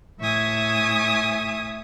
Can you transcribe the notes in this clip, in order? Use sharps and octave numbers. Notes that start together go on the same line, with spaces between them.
A2 E5 G#5 C#6 D#6